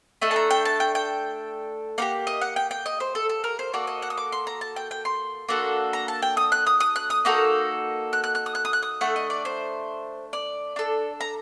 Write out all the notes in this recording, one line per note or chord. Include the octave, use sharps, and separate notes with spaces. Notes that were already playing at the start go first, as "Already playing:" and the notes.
A3 D4 A4 D#5
A5
A#5
G5
A5
G5
G5
A#3 D#4 G4 F#5
D#5
F#5
G5
G5
D#5
C5
A4
A4
A#4
C5
A#3 F#4 A4 D5
D#5
F#5
D#6
D6
C6
A#5
A5
G5
G5
C6
A#3 D4 F#4 A4
A#5
A5
G5
D#6
F#6
D#6
D#6
F#6
D#6
A#3 D#4 F#4 A4
F#6
F#6
F#6
D#6
F#6
D#6
F#6
D#6
A3 D4 A4 F#5
D#5
D5
C5
D5
D4 A4
A#5